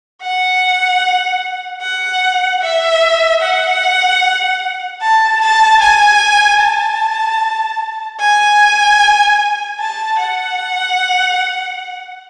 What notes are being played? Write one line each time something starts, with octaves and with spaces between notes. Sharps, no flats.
F#5
F#5
E5
F#5
A5
A5
G#5
A5
G#5
A5
F#5